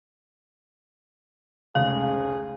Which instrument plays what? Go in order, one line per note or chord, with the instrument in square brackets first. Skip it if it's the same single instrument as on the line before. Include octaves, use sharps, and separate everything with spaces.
[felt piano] F1 C#2 C#3 [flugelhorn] G#4 [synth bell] F5